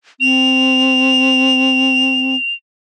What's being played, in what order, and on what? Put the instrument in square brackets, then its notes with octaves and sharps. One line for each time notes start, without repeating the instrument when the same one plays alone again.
[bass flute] C4 [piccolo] F7